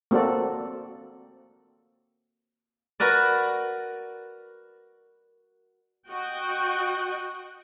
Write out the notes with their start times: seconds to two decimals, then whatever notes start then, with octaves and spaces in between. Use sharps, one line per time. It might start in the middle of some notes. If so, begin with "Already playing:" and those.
0.11 A#3 C4 F#4 A4 D5
3.00 F#4 A#4 B4 D5
6.09 F#4 D#5 G5